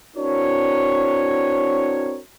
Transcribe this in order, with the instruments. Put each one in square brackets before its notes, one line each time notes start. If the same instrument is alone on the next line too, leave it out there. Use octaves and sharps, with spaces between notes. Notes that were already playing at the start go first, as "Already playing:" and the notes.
[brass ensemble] C4 D4 E4 F#4 A#4 C#5